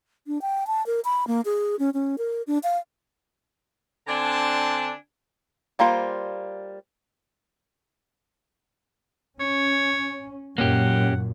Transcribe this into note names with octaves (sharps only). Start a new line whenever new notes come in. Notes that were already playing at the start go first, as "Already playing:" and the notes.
D4
G5
A5
A#4
B5
A#3
G#4
C#4
C#4
A#4
D4
F5
D3 C4 D4 G#5 A5
G3 A#3 F4 C5
C#4 C#5
F#2 A#2 A#3 C#4 G4 F#5